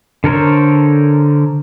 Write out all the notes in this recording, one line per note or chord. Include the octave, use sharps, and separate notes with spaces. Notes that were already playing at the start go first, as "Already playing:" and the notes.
D3 A4 A#4 C5 C#5